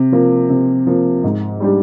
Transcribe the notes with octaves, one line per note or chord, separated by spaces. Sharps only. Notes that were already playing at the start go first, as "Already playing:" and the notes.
Already playing: C3
F3 A#3
C3
F3 A#3
G#2
G3 D4 G4